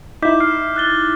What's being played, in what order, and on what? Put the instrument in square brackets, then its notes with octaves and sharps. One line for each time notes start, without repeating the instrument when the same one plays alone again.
[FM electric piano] D#4 E4 [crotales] D6 G6 B6
[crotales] F6 C7
F#6 A6 G7